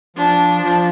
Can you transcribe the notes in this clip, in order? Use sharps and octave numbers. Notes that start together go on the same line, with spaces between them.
F3 D4
F3